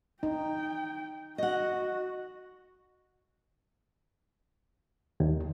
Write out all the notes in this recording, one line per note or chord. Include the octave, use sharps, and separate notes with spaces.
D#4 G5
F#4 D#5 F#5
D#2